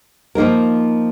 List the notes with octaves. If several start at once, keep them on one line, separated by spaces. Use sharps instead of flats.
F3 A#3 D#4 A#4